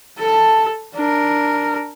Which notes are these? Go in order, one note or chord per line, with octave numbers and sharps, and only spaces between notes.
A4 A5
D4 A#4